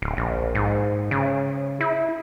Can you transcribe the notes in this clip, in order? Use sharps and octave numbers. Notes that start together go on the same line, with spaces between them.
D1
A#1
G#2
C#3
E4